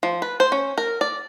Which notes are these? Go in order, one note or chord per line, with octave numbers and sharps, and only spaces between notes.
F3
B4
C5
C#4
A#4
D5